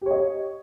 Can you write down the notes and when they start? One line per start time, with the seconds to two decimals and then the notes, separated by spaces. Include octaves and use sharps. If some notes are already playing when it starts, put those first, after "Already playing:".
0.01 G4
0.06 C#5
0.11 D#5